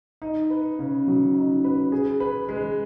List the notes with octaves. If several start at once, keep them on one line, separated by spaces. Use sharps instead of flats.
D#4
B4
C#3
F#3
D#4
B4
G#4
B4
G#3